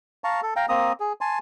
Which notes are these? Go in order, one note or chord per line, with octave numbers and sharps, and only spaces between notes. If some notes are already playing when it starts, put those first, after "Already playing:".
F5 A5 A#5 C#6
A4
F5 G5 A#5
A#3 C4 A#5 D#6
G#4
G#5 A5 C6